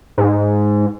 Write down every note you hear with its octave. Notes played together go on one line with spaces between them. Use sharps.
G#2